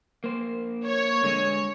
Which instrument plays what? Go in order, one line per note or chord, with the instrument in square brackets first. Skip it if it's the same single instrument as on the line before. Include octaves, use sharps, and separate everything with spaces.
[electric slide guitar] A#3 C5
[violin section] C#5
[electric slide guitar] D3 G#3